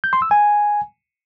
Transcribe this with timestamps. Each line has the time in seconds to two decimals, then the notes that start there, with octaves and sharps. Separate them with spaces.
0.04 G6
0.13 C6
0.22 E6
0.31 G#5